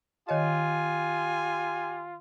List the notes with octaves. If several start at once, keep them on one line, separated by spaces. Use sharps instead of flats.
D#3 F4 G4 C#5 D#5 G#5